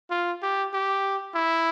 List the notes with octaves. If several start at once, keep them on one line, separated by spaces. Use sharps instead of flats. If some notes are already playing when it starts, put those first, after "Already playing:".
F4
G4
G4
E4